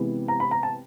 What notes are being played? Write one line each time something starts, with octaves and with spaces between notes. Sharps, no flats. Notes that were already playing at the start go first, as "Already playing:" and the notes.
Already playing: C3 E3 G#3 B3
A#5
B5
A#5
A5